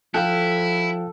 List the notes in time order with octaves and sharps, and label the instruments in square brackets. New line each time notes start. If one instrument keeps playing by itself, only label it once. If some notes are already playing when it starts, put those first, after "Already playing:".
[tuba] F3 [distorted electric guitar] E4 [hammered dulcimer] A4 [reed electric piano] F5 G5 F#6